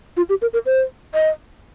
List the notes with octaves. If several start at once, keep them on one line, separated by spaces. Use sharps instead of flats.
F4
G4
A#4
A#4
C5
D#5